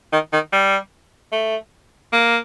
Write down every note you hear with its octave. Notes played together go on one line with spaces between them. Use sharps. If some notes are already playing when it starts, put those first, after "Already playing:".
D#3
D#3
G3
A3
A#3